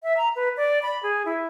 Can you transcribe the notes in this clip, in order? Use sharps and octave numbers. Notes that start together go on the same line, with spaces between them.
E5
A#5
B4
D5
B5
G#4
E4